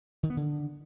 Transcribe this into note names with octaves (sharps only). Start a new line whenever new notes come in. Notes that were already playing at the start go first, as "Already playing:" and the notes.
D#3
B3
D3